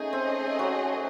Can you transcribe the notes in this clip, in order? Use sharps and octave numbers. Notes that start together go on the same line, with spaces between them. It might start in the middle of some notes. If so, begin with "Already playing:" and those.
Already playing: A3 C#4 D#4 G#4 D#5
C4
F#3